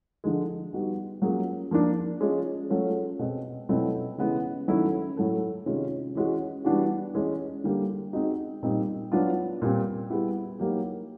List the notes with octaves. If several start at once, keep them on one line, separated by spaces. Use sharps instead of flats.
D3 F3 G#3
G3 B3 D#4 F#4
F#3 A#3 C#4 F4 G#4
F3 A#3 D4
G#3 C#4 F4 G#4
F#3 A3 C#4 F4
B2 G#3 C4
B2 F#3 A3 C4 E4
C#3 E3 G#3 B3
D#3 F#3 A3 C#4 E4
A2 F#3 A3
C3 D#3 G#3 C#4 F4
E3 G#3 C#4 F#4
E3 G3 B3 D4 F#4
E3 G#3 C#4
D3 G3 A#3
G#3 C4 D#4 F#4
A#2 G3 C4 D#4
F#3 B3 D4 F4
A#2 G3 C4
G3 B3 E4 G#4
F#3 A#3 D#4 G4